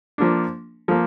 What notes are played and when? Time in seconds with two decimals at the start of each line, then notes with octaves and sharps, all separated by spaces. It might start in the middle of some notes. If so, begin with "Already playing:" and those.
0.18 F3 A#3 D4
0.88 F3 A#3